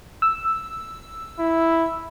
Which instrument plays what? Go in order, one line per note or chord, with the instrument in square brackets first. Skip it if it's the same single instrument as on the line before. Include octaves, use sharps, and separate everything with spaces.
[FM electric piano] E6
[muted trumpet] E4